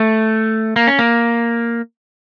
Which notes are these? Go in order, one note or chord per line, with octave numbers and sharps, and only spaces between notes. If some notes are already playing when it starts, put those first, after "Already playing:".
Already playing: A3
A#3
C#4
A#3